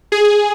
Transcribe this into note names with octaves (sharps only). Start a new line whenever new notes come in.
G#4